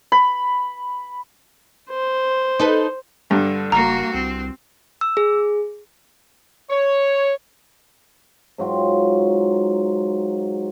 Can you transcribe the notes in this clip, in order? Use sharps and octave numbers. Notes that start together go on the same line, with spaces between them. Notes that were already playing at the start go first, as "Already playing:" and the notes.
B5
C5
D#4 A4 B4
G2 D3
F#1 A#3 F#4 A#5
C2 C4
E6
G#4
C#5
G#2 F#3 F4 G5